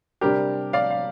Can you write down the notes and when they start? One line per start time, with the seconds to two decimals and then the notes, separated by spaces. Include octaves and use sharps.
0.21 C3 G3 D4 G4 A#4
0.73 D5 F5
0.91 F5